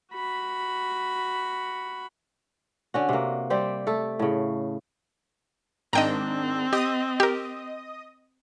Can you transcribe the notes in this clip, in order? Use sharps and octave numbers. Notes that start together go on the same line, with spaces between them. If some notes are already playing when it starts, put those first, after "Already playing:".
F#4 B5
D3 C#4 F#4
C3 A#3
G3 C4 G4 C5
A3 A4
A2 C#3
G#2 D#3 C4 D4 D#5 G5 A#5
G4 D#5 D#6
G4 A#4